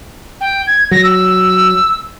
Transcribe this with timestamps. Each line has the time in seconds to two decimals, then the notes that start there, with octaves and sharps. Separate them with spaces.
0.41 G5
0.67 G#6
0.91 F#3 A#6
1.04 E6